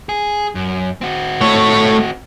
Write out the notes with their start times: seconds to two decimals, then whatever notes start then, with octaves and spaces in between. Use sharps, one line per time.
0.09 G#4
0.55 F#2
1.01 C4 F#4
1.41 A3 C#5